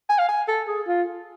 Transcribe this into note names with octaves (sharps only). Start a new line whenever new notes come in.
G#5
F5
G#5
A4
G#4
F4